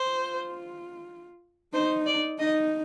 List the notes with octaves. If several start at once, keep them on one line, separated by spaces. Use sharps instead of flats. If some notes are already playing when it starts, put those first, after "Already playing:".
Already playing: C5
F4
D#4 C5
D5
D#4 D#5